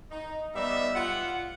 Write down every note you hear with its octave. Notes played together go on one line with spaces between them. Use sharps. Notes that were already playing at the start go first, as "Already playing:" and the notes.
D#4
G3 B3 D#4 D5 E5
F4 F#5